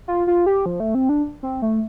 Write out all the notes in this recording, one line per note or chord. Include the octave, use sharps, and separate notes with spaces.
F4
F4
G4
F3
A3
C4
D4
C4
A3